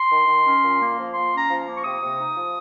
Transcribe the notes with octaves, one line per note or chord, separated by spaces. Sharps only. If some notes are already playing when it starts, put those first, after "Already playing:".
Already playing: C6
D#3
D#3
C#4
A#2
A#3
F3
A#3 C6
C#4
A#5
F3
A#3
C#6
C3 D#6
C3
D#4
F3